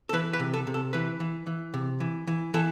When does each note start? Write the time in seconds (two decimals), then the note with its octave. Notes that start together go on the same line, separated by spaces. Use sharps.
0.09 A4
0.13 E3 B4
0.33 B4
0.40 C3
0.54 A4
0.67 C3
0.74 A4
0.93 E3 B4
1.20 E3
1.47 E3
1.74 C3
2.00 E3
2.27 E3
2.54 E3 A4